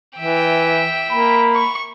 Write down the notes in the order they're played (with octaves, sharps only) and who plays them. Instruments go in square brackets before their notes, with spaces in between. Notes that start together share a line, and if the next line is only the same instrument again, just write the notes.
[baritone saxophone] E3 [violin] E5 G5
[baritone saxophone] A#3 [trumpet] B5
[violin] C#6